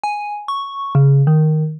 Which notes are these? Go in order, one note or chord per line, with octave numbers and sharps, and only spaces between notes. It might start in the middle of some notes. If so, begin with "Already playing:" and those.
G#5
C#6
C#3
D#3